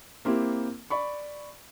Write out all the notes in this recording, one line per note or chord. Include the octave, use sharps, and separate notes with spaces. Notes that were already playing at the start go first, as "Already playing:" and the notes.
A#3 C4 E4 G4
D5 B5 C#6